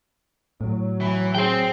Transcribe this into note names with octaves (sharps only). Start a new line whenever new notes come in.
A2 F#3
E3
G#4 C5 G5